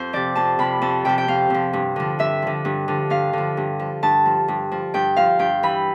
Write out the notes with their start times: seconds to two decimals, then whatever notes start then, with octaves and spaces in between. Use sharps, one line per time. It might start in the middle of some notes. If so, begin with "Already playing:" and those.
Already playing: F2 C5
0.13 C3 F3 D5
0.35 F2 A5
0.59 C3 F3 B5
0.82 F2 A5
1.05 C3 F3 G5
1.18 G5
1.28 F2 F5
1.50 C3 F3
1.73 G2
1.96 D3 F3
2.19 G2 E5
2.42 D3 F3
2.65 G2
2.88 D3 F3
3.10 G2 F5
3.33 D3 F3
3.57 G2
3.79 F3
4.03 G2 A5
4.26 F3
4.48 G2
4.72 F3
4.94 G2 G5
5.16 F3 F5
5.39 G2 G5
5.63 E3 B5